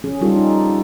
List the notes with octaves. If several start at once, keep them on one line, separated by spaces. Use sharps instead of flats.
F3 C#4 G#4
G3 C#4 D#4 F4 G4 A4
D#4